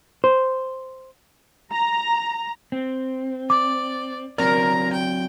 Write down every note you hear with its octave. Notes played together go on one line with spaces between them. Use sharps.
C5
A#5
C4
D5 D6
F#3 C4 A#4 D5 A#5
G5